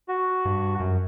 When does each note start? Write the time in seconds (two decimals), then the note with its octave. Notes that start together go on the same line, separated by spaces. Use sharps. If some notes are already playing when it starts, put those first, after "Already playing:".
0.08 F#4
0.45 G2
0.80 F#2